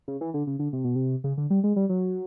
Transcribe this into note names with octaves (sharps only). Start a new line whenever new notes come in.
C#3
E3
D3
C#3
D3
C3
B2
C3
C#3
D3
G3
G#3
G3
F#3